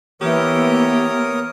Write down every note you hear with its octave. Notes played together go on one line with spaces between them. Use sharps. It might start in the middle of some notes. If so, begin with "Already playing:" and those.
E3 A#3 B3 G4 A#4 C#5 D#6